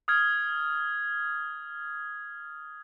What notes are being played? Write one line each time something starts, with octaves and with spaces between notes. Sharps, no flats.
D#6 F6 G#6